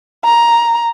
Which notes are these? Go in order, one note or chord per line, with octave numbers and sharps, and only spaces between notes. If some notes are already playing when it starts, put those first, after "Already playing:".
A#5